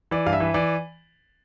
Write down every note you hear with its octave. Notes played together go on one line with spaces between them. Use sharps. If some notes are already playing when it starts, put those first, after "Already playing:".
E3 D5
G2 F5
E5
E3
E3 D5